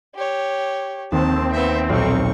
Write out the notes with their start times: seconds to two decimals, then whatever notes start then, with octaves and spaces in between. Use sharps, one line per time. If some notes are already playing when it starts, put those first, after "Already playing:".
0.15 G4 C#5
1.12 D#2 C4 A5
1.52 B3 E5
1.89 B1 A#2 D#4 C#6 F6